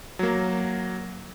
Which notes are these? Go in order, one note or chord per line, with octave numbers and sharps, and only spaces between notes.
F#3 A#3